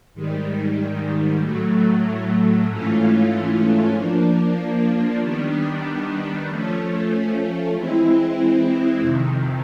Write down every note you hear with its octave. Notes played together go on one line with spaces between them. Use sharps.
G#2 D#3 G3
A2 F#3 A3
G#2 E3 A3 C#4 F4
F3 A#3 D4
D#3 G3 B3 D4
F3 A3 C#4
E3 G#3 C4 E4
F2 C3 D#3